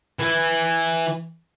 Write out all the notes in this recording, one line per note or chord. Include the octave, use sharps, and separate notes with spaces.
E3